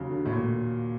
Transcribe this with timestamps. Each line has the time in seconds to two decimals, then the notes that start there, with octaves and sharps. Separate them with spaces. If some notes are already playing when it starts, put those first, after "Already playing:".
Already playing: D#2 C#3 F#3
0.10 D3
0.26 A2
0.31 A#2